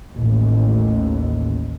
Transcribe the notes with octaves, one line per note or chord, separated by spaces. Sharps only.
A1 D#2